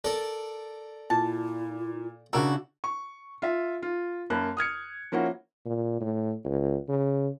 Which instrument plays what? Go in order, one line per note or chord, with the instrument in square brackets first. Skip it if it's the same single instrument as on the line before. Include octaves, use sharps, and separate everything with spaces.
[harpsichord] A4 A#4 D5
[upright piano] A#2 [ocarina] E4 [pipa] A5
[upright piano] C#3 D4 E6 [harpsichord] E4 F#4 [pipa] A#4
[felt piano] C#6
F4 E5
F4
F#2 A#3 A5 B5 F#6
D#6 F6 G#6 C#7
F3 A#3 C#4 E4 F#4
[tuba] A#2
A2
C#2
C#3